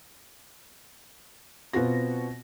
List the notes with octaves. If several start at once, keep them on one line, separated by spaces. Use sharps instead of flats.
B2 B3 C4 F4 F#4 A#6